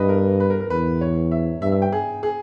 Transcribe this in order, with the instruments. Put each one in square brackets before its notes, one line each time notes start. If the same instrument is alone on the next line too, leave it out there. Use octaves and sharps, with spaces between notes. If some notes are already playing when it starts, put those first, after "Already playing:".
Already playing: [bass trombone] G2 [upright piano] B4 D#5
[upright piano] A#4
B4
A#4
A#4
[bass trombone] E2 [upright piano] B4
[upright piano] C#5
E5
[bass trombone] G2 [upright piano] E5
[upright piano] E5
G5
G#4
G#4